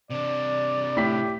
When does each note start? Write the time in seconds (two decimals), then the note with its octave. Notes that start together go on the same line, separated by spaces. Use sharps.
0.11 C3 D4 D5
0.97 A2 G4 B6